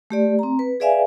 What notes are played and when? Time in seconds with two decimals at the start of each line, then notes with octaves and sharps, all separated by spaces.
0.10 A3 G4 D5
0.39 C4 A#5
0.59 B4
0.80 G#4 B4 D5 E5 F5 G#5